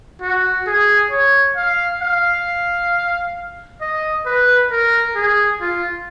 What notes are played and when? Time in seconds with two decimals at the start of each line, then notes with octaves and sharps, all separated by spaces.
0.21 F#4
0.67 G#4
1.11 C#5
1.56 F5
2.01 F5
3.81 D#5
4.26 B4
4.70 A#4
5.15 G#4
5.61 F4